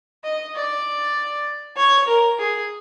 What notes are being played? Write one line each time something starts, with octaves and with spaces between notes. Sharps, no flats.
D#5
D5
C#5
A#4
G#4